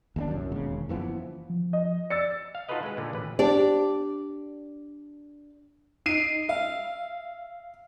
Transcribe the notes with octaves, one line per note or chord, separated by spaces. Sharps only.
D#2 G#3 D4
C2 F#2
E1 D#2 C#3
F#1 E3 F3 B3
F3
D#5
D5 E6 A6 C#7
F5
D#4 F4 F#4 A4 B4 D#5
G#3 B4
A#2 D3
A1 B4
D4 G4 D5
D#4 C7 D7 D#7
E5 F5